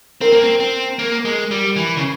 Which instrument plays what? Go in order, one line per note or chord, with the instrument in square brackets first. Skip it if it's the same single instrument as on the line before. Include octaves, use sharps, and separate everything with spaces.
[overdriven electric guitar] C4 [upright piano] A#4
[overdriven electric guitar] A#3
C4
C4
A#3
G#3
G3
E3
C#3